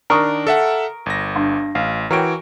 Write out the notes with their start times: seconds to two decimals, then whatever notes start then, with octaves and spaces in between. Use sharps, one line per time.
0.10 D#3 D4 A#4 C#6 D#6
0.47 A4 E5 F#5
1.06 G1 A#6
1.36 G2
1.75 A1 F5
2.11 E3 F#4 A#4 C#5 G5 D7